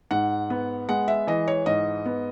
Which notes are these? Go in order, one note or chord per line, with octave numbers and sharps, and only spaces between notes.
G#2 F#5
B3
G#3 F#5
E5
E3 D#5
C#5
G#2 D#5
B3